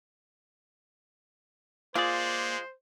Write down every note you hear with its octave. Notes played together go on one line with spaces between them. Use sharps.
G#3 A#3 F4 G#4 C5 D5